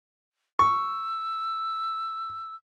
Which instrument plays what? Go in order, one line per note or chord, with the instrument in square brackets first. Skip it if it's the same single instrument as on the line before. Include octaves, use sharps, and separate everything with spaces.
[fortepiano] C#6 [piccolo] E6